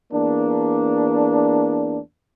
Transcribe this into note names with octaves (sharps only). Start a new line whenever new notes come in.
E2 A#3 D4